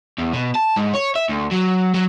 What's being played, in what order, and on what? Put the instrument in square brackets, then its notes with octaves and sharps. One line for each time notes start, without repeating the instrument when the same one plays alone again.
[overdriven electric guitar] E2
B2
A5
G#2
C#5
E5
D2
F#3
F#3